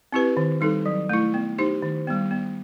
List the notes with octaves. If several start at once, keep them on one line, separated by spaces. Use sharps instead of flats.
C4 E4 G4 B4
D#3
G3 D#4 A4
F#3
A3 E4
B3
D#4 G4 C5
D#3
G3 B3
B3